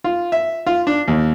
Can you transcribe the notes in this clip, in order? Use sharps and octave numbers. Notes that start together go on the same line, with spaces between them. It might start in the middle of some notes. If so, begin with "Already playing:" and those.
F4
E5
F4
D4
D#2